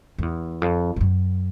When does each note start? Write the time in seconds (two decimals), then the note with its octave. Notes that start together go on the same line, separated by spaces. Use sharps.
0.19 F2
0.23 E2
0.62 F2
0.96 F2
1.01 F#2